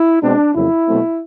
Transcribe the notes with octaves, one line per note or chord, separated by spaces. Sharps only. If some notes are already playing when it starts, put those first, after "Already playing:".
Already playing: E4
B2 G#3 C4 D4
F2 C#3 F#3 A#3 E4
B2 F#3 A3 C4